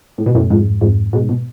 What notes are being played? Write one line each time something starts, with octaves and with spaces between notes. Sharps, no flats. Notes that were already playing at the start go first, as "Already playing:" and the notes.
A2
B2
F#2 A2
F2 G#2
F2 G#2
G#2 B2
B2